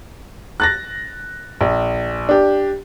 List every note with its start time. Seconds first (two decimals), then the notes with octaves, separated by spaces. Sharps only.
0.60 F#6 A6 A#6
1.61 A#1
2.29 D4 G4